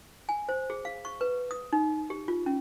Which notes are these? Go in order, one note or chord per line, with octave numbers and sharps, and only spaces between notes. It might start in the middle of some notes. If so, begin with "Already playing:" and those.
G#5
C5
G#4
F5
C#6
B4
D#6
D#4
G4
F4
C#4